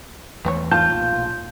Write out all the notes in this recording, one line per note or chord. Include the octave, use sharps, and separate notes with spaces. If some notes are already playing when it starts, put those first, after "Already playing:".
E2 E3 A3 B3 C4 C#5
D#3 F4 A5 G6
B1 A#2